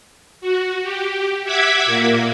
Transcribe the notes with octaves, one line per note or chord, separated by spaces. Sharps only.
F#4
G4
E5 F#5 D6 G#6 B6
A#2 A#3